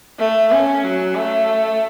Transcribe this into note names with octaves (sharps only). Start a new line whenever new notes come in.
A3
C#4
F#3
A3